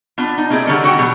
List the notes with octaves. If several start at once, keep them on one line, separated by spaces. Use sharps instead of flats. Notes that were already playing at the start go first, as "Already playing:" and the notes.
B3 D4 F4
D#4
A#3 C4 E4 G#4 D5 D#5
D3 D#3 G3 A#3 C#4 A4
F#4 A4 F#5 G5
B2 E3 F#3 G3